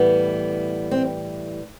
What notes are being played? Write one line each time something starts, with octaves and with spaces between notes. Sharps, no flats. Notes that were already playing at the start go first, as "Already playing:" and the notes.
Already playing: A2 E3 G3 B3
C4